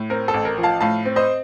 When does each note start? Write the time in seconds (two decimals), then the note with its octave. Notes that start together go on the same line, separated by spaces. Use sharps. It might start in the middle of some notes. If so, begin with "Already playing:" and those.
Already playing: A2
0.10 C4 A#4
0.28 A4
0.34 A1
0.45 A#4
0.58 F3
0.63 F5 A5
0.81 A2 F5 A5
1.05 C4
1.16 C5 D#5